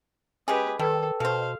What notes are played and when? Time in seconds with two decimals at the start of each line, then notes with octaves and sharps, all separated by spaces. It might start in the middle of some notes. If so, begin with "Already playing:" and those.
0.48 G#3 C#4 G4 G#4 B4
0.79 D#3 G3 A4 B4 G5 A5
1.20 B2 A4 C5 F5